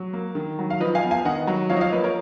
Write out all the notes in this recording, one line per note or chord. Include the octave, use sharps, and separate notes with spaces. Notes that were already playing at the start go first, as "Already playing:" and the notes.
Already playing: F#3
A#3
D#3
F#3
F5
F3 B4 D#5
F5 G#5
B3
F5 G#5
D#3 D#5 F#5
F#3
F3 C#5 F5
D#5
C#5 F5
A#3 B4 D#5
A#4 C#5